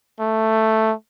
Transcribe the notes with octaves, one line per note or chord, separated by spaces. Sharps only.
A3